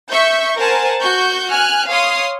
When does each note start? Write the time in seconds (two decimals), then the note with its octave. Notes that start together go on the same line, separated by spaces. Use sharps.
0.10 E5 C#6 G6
0.57 A#4 C5 F#5 G#5 A5
1.01 F#4 C#6 G6
1.51 G#5 F6 F#6
1.89 C#5 F5 C6 D#6